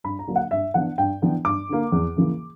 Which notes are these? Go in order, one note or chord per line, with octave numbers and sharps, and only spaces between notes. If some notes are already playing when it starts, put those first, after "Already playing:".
G2 B5
A#5
D3 F#3 A#3 D4
F#5
G2 E5
E3 B3 D4 F#5
G2 G5
E3 B3 D4
G2 D6
D3 A#3
E2
C#3 E3 A#3